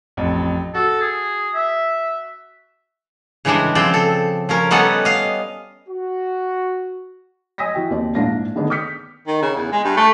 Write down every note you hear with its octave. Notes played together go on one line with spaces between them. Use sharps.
A1 F2
F#4 A4
G#4
E5
C#3 E3 G3 G#3 D4
C#3 F3 C4 D5 G5
A4
F3 C#4 A#4
G3 B3 C#4 A4 D#5 F#5
D#5 F5
F#4
D#5 G#5 D#6 E6 A#6 B6
E3 F#4 G5
D#2 C4 D5
A#1 G#2 D4 E4 F5 A#6
D3 D#3 B3 D4 G#4 D5
D6 D#6 F6 G6 B6 C#7
D#3
C#3
E2
G#3
G2
A3